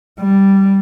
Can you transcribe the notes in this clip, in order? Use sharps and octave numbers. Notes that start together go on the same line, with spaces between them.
G3